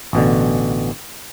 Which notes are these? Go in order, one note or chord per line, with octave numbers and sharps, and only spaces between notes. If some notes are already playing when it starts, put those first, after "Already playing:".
A1 B2 D3